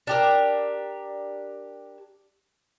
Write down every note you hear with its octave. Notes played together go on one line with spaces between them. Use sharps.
D4 G4 A#4